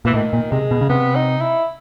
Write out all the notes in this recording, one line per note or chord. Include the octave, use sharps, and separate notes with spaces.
A#2 E3
A2 D#3
A#2
C3 G#3
B2
C#3
C3 B3
D#4
E4